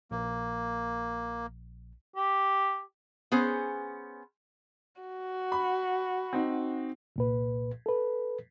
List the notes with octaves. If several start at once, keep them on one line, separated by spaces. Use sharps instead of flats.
A#1 A#3
G4
B3 C#4 G#4 C5
F#4
B5
C4 D#4
C2 A#2 B4
A4 B4